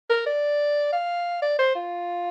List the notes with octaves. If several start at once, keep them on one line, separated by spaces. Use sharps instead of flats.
A#4
D5
F5
D5
C5
F4